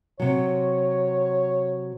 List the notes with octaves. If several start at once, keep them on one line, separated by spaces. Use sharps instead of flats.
C3 F#3 C#5